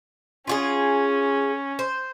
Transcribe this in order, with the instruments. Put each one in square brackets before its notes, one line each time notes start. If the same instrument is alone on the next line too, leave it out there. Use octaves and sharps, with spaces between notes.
[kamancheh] C#4 [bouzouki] F4 F#4 G#4
[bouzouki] C5